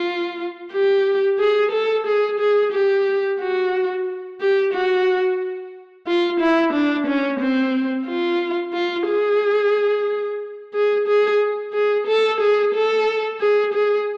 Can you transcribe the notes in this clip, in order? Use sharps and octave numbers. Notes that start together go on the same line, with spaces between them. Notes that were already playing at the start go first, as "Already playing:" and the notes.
Already playing: F4
G4
G#4
A4
G#4
G#4
G4
F#4
G4
F#4
F4
E4
D4
C#4
C4
F4
F4
G#4
G#4
G#4
G#4
A4
G#4
A4
G#4
G#4